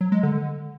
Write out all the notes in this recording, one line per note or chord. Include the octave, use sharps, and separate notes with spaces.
F#3
G#3
D3